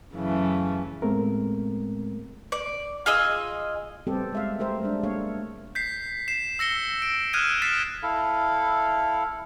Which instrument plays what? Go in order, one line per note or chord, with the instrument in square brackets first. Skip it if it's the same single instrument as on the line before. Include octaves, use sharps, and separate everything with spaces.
[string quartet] F#2 C#3 E3 A3
[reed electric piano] A2 G#3 A3 B3 C4 A#4
[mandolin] D5
F4 G#4 D#5 E6
[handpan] G3 B3 C4 G4 A4
G#3 E5 F5
A3 G4 A#4 C5 E5
G3 G#3 D4
A3 A#3 D4 A4 C#5 F5
[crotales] G6 B6 C7
C7 E7
E6 A#6 C#7 G7
D7
D#6 F6 F#6 G#6 D#7 E7
F6 A6 B6 C7 D7 E7
[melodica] E4 A4 F5